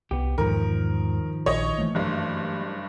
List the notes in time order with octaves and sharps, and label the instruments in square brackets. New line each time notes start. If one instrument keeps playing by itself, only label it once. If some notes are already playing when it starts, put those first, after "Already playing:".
[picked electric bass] C2 [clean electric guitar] B3 G4
[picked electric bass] E2 G#2 [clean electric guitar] D#3 F3 [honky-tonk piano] A#4
[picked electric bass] A#1 [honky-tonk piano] C#5 D#5
[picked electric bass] E3 A3 A#3
[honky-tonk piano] F#1 G2